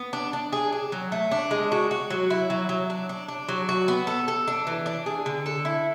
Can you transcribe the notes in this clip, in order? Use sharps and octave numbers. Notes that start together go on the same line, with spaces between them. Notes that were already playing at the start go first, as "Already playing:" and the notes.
Already playing: B3
D4
D4
G#4
D4
F#3
A3
D4
G#3
F#4
F#4
F#3
E4
F#3
F#3
D4
D4
D4
F#3
F#4
B3
A4
A4
D4
E3
D4
G#4
D3
A4
E4